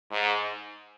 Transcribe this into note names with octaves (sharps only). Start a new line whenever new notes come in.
G#2